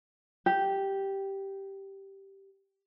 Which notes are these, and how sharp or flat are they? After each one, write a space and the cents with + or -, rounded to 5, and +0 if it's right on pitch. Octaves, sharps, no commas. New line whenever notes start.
G4 -5